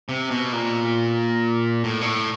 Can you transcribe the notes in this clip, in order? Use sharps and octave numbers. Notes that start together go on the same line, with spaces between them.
C3
B2
A#2
A2
A#2
A2